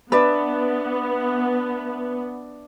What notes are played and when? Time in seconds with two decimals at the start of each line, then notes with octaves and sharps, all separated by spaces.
0.12 B3 D4 B4 D5 E5